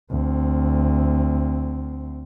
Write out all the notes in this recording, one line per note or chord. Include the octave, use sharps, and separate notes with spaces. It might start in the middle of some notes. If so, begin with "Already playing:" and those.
D2 C4